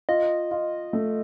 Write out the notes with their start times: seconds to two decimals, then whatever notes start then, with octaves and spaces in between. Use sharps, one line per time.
0.09 F4 D#5
0.51 F4
0.93 A3